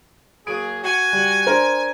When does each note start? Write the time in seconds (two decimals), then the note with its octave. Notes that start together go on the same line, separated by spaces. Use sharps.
0.47 F#3 A#3 G#4 D7
0.84 F#4 G#5
1.13 G3
1.46 D4 A#4 C5